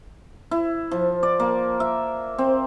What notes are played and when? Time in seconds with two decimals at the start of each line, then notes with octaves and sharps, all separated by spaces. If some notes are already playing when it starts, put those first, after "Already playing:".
0.51 E4
0.91 F3
1.23 D5
1.40 A#3
1.80 E5
2.38 C4